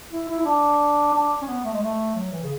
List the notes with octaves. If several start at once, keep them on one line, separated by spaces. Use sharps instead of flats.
E4
E4
E4
D4
D4
C#4
B3
A3
G#3
A3
F#3
E3
C#3